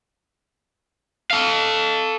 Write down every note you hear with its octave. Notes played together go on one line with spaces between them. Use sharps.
A4 F5